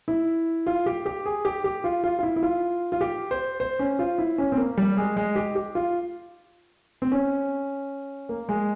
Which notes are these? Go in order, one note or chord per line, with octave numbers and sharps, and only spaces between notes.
E4
F4
G4
G4
G#4
G4
G4
F4
F4
F4
E4
E4
F4
F4
G4
C5
C5
C#4
F4
E4
C#4
C4
A#3
G3
G#3
G#3
G4
G4
F4
C4
C#4
A#3
G#3